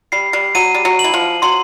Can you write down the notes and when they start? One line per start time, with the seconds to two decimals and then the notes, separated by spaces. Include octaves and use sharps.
0.12 G3 C7
0.33 G3
0.55 F#3 D#7
0.74 G3
0.85 F#3
0.99 F#7
1.04 E3
1.14 F3
1.42 F#3 C6